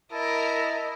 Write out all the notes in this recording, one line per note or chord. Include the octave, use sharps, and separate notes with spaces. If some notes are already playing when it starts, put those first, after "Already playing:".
E4 A#4 D#5 A5